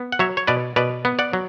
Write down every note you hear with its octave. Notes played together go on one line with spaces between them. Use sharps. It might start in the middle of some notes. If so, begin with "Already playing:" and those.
Already playing: B3
F#5
F#3 C#5 E5
C#5
B2 B4 D5
B2 B4 D5
B3
D5 F#5
F#3